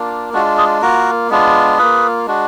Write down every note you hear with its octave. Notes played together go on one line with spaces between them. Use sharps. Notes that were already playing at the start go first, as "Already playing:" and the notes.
Already playing: A#3 D4 F4
G#3 D4 F4 F#4
G#4
A#3 F4 F#4 A#4
G#3 B3 D4 F4
A#3 F4 G#4 B4
G#3 D4 F#4